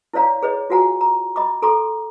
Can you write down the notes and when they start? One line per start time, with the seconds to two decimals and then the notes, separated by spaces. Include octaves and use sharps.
0.14 E4 B4 C#5 D5 F5 A#5
0.43 G#4 B4 C#5 D#5
0.70 F4 F#4 B4 F#5 G#5 A#5
1.01 A#5
1.36 D#5 A#5 B5 D6
1.62 A4 A#5 C6 D6